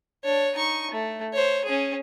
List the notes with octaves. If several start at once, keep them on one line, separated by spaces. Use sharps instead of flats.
D4 C#5
D#4 C#6
A3
C5 C#5
C#4 G#4